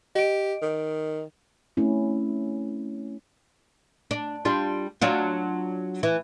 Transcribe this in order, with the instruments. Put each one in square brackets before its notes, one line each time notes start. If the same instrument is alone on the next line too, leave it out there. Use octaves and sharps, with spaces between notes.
[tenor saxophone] G4 [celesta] D#5 D7
[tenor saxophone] D#3
[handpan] A3 C4 C#4 E4
[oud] D4
G3 D4 F4
F#3 D4 F4
E3